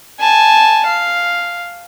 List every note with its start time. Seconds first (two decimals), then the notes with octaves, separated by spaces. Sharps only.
0.20 G#5 A5
0.86 F5